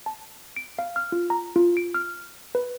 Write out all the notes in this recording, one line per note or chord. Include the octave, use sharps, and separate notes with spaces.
A5
D7
F5
F6
F4
A#5
F4
D7
F6
B4